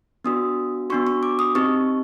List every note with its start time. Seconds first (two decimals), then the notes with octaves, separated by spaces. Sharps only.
0.24 B3 D4 F#4 D#6
0.90 B3 D4 F#4 C#6
1.07 C#6
1.23 D6
1.39 D#6
1.55 C4 D#4 G4 C#6